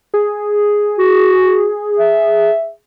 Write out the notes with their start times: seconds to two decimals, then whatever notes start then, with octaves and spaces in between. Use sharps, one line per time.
0.14 G#4
0.99 F#4
1.98 E5